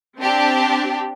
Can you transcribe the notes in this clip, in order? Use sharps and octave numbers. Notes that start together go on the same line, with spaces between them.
C4 D4 G4